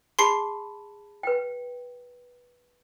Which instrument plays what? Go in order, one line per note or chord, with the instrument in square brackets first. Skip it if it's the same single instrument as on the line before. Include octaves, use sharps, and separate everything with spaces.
[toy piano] G#4 A5 B5 [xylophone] C6 C7
[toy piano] B4 G5